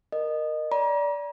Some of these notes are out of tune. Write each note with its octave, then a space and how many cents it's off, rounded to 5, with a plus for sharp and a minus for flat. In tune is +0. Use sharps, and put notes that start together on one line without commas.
A#4 +0 D#5 -20
D5 -20 A#5 +40